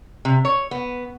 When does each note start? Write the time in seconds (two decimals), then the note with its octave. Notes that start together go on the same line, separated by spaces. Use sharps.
0.25 C3
0.45 C#5
0.71 B3